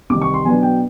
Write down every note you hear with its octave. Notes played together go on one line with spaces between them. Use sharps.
C2 C3 D#3 D6
C#6
C6
B2 F#3 B3 D4 G#5
G5